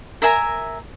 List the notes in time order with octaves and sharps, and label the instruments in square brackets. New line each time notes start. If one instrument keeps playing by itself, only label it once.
[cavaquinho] A#4 E5 G#5 A#5